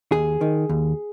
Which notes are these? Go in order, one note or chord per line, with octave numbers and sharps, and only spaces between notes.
D#2 G#4
D#3
D#2